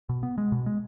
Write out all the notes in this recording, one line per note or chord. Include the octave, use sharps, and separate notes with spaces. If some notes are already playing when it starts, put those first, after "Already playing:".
B2
B3
G#3
B2
G#3